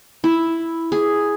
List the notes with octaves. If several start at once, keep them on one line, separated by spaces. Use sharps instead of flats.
E4
G#4